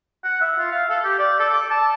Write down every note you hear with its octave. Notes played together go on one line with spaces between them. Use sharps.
F#5
E5
F4
F5
A4
G4
D5
A4
D6
A5